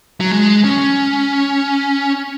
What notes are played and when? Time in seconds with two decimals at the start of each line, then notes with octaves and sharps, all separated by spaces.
0.20 F#3
0.31 G#3
0.64 C#4